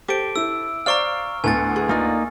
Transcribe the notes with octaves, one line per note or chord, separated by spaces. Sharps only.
G4 A4 C5 D6 D7
E4 E6
C5 D5 F5 A#5 C#6 F6
D2 A2 B3 G#5 A5 A6
G#4
A#3 D#4 F4 D5